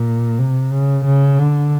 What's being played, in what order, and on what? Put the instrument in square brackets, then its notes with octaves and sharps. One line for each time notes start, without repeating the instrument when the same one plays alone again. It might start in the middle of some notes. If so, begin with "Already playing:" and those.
Already playing: [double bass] A#2
C3
C#3
C#3
D3